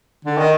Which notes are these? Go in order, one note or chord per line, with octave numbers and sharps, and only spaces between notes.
D3
D#3